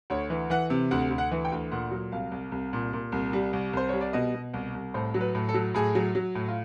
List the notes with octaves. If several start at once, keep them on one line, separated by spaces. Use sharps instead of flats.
D2 C#5
E3
E3 F#5
C3
D2 F#5
D2
F#5
E3
G5
D2
A#2 F#5
F#3
C2 F5
C2
C2
A#2
A#2
C2
G3
C2
C2 C5
G3 C#5
D5
B2 D#5
B2
C2
C2
A2 C5
F#3
B4
A2
A4
F#3
A2 G#4
F#3
F#3
A2
F4